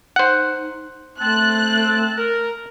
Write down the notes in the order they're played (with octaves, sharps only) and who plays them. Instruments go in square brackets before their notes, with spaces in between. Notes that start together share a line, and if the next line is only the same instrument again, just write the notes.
[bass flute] D#4 [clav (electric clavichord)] C5 F#5
[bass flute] A3 [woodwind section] C4 A5 [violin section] F#6
[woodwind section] A#4